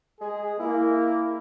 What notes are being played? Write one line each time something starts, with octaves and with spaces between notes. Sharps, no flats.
G#3 G#4
A#3 E4